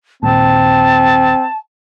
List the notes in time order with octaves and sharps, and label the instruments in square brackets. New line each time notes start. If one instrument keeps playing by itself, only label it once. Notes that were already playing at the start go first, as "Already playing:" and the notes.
[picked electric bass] A#1 D#2 A#2 [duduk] C4 [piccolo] A5